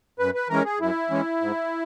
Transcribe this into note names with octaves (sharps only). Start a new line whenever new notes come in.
F#2 B4
B4
E3 G#3 C#4 A#4
G#4
F#2 E4
E3 G#3 C#4
G#2